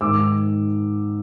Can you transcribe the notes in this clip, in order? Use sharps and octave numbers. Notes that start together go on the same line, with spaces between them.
G#2 D#3 D6 E6